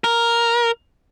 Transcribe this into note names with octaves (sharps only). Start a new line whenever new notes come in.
A#4